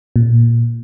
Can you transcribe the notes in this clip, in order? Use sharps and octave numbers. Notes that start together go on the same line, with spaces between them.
A#2